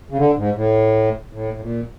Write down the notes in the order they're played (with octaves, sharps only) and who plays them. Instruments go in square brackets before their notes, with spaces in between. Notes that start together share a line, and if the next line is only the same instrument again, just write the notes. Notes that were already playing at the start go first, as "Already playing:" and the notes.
[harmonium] C#3
D3
G#2
A2
A2
A2
A#2